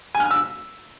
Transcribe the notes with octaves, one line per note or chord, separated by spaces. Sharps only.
G#5
F6
G#5
E6